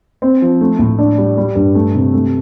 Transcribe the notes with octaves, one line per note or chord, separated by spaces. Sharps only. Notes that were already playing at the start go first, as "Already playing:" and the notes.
C4
F3
A3
A2
D4
G3
G3
G2
A3
C3
A3